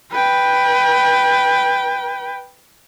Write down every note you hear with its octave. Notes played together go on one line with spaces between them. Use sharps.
B4 G5